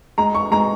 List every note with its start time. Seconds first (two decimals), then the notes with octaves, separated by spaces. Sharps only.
0.18 G#3 A#5
0.35 C#6
0.51 G#3 A#5